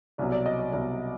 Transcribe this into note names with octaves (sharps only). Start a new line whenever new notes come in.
C2 B2 F#3 D5
D5
D#5
D#5
C2 B2 F#3 D5